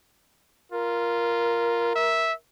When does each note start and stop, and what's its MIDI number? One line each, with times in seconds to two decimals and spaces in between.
0.71 1.93 65
0.71 2.36 70
1.95 2.33 76